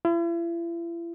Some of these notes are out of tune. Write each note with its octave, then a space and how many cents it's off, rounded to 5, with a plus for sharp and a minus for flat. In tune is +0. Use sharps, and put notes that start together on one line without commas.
E4 +40